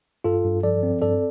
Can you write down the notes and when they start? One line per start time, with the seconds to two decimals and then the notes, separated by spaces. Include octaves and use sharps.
0.24 G2 F4 A4
0.45 G2
0.63 F3 A4 D5
0.83 C4
1.02 G2 A4 D5